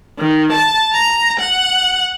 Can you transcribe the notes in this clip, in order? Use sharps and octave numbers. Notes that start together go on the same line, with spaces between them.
D#3
A5
A#5
F#5